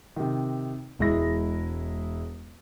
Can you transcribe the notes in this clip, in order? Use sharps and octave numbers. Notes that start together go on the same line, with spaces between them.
C3 D#3
E1 G#3 E4 A#6